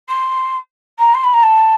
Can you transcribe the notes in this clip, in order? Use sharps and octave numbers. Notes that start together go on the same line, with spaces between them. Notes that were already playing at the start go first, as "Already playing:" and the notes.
C6
A#5
C6
B5
A#5
A5